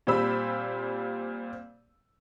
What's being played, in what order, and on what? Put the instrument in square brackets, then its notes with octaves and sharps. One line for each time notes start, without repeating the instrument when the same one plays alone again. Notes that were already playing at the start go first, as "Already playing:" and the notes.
[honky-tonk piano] A#2 G3 C4 B5 E6